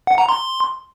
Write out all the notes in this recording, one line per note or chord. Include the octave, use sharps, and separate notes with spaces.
F#5
A#5
C6